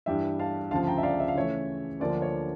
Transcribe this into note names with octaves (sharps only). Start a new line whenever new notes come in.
G2 E3 G3 E5 G5
F5 A5
D2 C#3 F3 F5 A5
G5 A#5
E5
D5 F5
E5
F5
C#3 E3 A3 C#5 E5
D2 D3 F3 A#3 D5
C#5